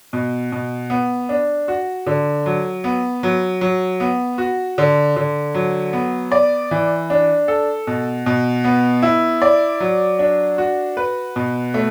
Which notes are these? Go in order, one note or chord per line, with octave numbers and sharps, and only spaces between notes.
B2
B2
B3
D4
F#4
D3
F#3
B3
F#3
F#3
B3
F#4
D3
D3
F#3
B3
D5
E3
D4
A4
B2
B2
B3
E4
D5
F#3
D4
F#4
B4
B2
A3